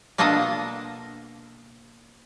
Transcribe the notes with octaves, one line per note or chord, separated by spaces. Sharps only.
B2 A#3 D4 F4 A4 D#5